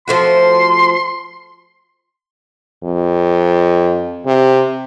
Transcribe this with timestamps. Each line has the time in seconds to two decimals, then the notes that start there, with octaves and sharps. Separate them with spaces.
0.08 F3 A3 F#4 C6
2.84 F2
4.26 C3